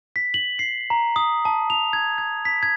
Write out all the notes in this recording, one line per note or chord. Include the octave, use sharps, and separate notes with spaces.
B6
F#7
C7
A#5
D#6
A5
F7
G#6
G#6
B6
G#6